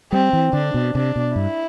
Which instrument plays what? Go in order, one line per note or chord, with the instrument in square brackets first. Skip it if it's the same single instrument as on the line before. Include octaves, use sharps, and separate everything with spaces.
[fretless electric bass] G3 [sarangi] C4
[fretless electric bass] E3
[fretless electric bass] D3 [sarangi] D4
[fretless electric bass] B2
[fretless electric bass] C3 [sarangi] D4
[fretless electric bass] B2
[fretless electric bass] G2 [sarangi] E4